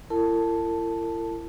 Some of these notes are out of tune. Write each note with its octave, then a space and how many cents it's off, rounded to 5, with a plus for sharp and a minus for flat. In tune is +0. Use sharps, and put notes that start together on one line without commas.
E4 +40 A#4 -45 A5 +0